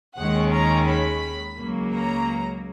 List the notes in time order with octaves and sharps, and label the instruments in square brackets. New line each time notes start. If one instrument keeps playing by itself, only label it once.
[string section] D#2 D#3 G#3 C#4 F#5
A#5
B5
C#2 C#3 F#3 A#3
A#5